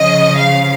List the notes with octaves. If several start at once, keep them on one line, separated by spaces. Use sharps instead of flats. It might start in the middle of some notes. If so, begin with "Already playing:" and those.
Already playing: C#3 F3 D#5
F5